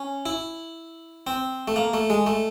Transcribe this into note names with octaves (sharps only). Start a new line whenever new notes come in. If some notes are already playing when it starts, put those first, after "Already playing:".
Already playing: C#4
E4
C4
A3
A#3
A3
G#3
A3